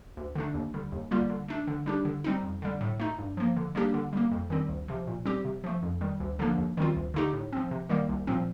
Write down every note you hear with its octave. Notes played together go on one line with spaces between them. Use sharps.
D2
D3 A3 D4
D#2
D3 G3
D#2
D3 G3 A#3 F4
D3
A3 D4
D3
G3 D4 G4
D3
G3 C4 D#4
F2
D3 G3
A2
A3 D#4
G2
F3 A#3
D3
G3 A#3 D4 G4
D3
G3 A#3
F2
D#3 G3 C4
D2
C3 F3
A#2
G3 C4 G4
C3
F3 A3
F2
D#3 G3
D2
D3 F3 A#3 D4
D#2
D#3 G3 C4 F4
D2
D3 A3 D#4 G4
A2
F3 C4
C3
D#3 G3 A#3
C2
A#2 F3 C4